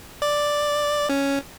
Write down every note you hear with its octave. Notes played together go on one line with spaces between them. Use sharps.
D5
C#4